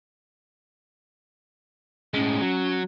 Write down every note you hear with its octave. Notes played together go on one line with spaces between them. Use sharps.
A2 G#3 C#4
F#3